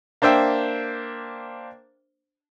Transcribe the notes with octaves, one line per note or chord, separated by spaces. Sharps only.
A#3 D4 C5 E5 G5